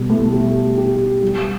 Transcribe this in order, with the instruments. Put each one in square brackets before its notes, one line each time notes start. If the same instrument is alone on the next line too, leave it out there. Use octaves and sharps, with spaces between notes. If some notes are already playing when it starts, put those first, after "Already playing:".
Already playing: [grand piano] B2 G3
[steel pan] A3
[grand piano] G4
G4
G3